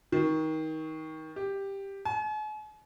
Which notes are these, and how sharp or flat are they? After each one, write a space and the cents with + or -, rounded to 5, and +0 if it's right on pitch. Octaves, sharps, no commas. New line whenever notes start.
D#3 +25
G4 +5
G#5 +45